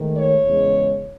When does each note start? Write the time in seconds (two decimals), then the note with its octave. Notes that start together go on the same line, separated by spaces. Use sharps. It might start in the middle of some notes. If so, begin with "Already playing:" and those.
Already playing: G#2 D#3 A3
0.18 C#5
0.46 E2 C#3 G#3